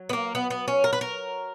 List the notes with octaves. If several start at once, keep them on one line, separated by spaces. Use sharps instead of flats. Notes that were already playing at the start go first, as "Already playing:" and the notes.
Already playing: F#3
B3
A#3
B3
B3
C#4
A#4
B4
A#4